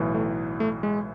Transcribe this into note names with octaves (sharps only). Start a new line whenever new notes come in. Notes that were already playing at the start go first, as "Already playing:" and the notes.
Already playing: B1 A2 E3
A3
A3
G#3